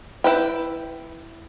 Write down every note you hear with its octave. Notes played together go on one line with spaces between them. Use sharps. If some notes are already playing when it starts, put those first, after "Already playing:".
E4 B4 G5